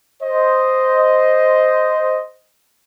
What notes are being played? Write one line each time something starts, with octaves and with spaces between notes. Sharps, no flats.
C5 D#5